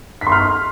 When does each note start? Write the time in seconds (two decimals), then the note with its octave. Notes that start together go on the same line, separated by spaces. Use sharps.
0.21 B6
0.27 C6
0.32 F6